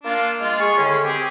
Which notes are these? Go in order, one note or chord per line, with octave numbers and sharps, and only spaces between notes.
A#3 D4 F4
G#3 F4
G#4 C#6
A2 D3 D#3 C#4
C4 G4 G#4